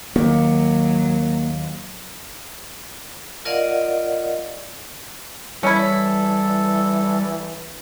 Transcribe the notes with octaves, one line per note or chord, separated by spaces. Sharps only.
D#2 F#3 A#3
F4 A#4 D5 D#5 F5 F#5
E3 G3 C#4 E4 A4